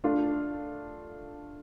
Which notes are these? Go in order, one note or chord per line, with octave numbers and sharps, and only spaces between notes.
A3 D4 F4